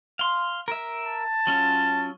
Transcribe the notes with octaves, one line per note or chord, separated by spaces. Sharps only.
F5 C6
A#4 E5
A5
F#3 C#4 F4